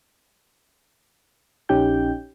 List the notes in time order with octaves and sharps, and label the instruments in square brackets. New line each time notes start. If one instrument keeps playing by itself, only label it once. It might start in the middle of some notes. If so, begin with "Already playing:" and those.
[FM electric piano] A#1 C#4 D#4 G4 G5 G6